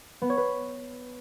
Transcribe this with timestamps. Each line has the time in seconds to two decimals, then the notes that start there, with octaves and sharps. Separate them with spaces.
0.22 B3
0.30 C#5
0.37 B4